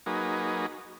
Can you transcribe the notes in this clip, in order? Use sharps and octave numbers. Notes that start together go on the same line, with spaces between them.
F#3 A#3 D#4 G#4 B4